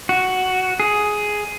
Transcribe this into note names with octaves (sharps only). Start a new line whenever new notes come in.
F#4
G#4